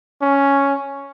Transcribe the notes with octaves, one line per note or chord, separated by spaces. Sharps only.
C#4